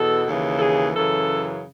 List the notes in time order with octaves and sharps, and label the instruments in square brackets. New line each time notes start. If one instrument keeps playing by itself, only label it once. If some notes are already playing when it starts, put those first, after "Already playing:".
Already playing: [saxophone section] E2 B2 A4
D#2 C#3 E3
A4
G#4
F#2 C#3 E3 A4